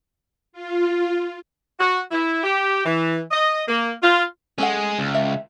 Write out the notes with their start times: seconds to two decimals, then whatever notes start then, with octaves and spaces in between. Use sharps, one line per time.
0.53 F4
1.80 F#4
2.11 E4
2.44 G4
2.85 E3
3.31 D#5
3.68 A#3
4.03 F4
4.58 G#3 C#4 G#4 A4 F#5
4.99 C#2
5.14 E5